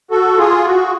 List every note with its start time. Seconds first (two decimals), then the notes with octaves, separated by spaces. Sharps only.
0.11 F#4 A4
0.38 F4 G#4
0.65 F#4